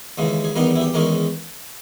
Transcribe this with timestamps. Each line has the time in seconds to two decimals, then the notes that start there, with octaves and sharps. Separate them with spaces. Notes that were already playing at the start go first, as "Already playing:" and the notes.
0.18 D#2 C#3 E3 G#3
0.44 G#4
0.55 E2 D#3 G3 B3 D#4 A#4
0.76 E4
0.81 G4
0.94 E2 D#3 G#3 C#4 A#4